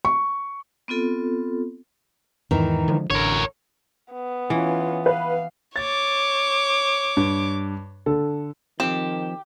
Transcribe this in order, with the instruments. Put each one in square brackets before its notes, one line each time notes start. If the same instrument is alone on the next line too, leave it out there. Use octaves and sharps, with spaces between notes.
[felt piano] C#6
[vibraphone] B3 C4 F4 A4
[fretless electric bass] E2 G#2 [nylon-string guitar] D#3 E3 D#4
[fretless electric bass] D3 F3 G#3
[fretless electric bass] A1 [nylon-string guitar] D3 [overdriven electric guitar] A#4 C#5
[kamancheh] B3
[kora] E3 [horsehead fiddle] C#4 F4
[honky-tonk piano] B4 [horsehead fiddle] F5
[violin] C#5 D6 [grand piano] A6
[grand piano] G2
D3 A4
[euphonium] D#3 [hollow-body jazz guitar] F3 C4 [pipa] G4 [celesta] E7